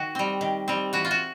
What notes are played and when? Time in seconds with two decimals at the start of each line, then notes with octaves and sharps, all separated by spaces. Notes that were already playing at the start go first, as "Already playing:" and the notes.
Already playing: D#3 F#4
0.15 G3 C4
0.41 D#3
0.68 G3 C4
0.93 E3 F#4
1.05 F4
1.11 F#4